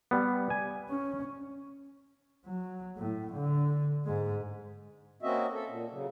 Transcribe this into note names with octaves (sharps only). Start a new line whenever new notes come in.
G3 B3
G#5
C#4
F#3
A2
D3
G#2 G#3
A#3 C4 C#4 F#4 D#5 E5
A4
A#2
C#3 F#3